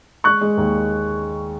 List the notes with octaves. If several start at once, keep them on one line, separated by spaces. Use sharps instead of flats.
G#3 C#6 F#6
G#3
D#2